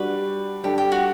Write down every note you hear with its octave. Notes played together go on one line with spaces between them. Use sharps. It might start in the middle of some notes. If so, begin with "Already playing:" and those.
Already playing: G3 D4 F#4 B4
G3 D4 G4 A4
G4
F#4